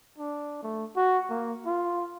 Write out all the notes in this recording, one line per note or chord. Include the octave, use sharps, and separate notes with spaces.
D4
A3
F#4
A#3
F4